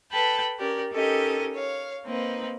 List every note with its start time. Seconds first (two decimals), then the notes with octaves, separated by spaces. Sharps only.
0.11 A4 B4 G5 A5 B5
0.59 C#4 G4 A#4 D5
0.92 C#4 D#4 G4 A4 A#4 D#5
1.55 C#5 F5
2.05 A#3 C4 D#4 B4